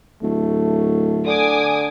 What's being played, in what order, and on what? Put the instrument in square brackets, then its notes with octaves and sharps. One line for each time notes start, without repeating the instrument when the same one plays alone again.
[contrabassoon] D1 [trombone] A3
[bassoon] D3 [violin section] G#5 D6 D#6